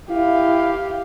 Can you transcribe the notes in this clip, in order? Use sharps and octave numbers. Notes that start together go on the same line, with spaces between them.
E4 G4 F5